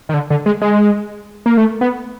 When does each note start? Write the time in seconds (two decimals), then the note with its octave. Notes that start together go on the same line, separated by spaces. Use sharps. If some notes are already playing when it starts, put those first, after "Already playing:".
0.09 D#3
0.14 D3
0.30 D3
0.46 G#3
0.62 G#3
1.46 A#3
1.57 A3
1.81 B3